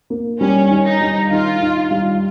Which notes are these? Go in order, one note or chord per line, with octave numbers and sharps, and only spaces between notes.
A#3
G3 C#4
D#3
D#4
G3
D#3 F4
D#4
G3